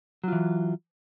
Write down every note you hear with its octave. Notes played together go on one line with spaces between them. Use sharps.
E3 F#3 F4